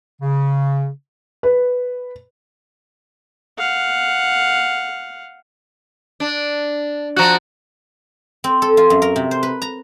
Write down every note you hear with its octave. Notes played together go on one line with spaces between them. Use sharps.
C#3
B4
F5 F#5
D4
F3 F#4 A#5 F#6
C4
A4
F4
F#2
A#4
C3
C5
B4
A#5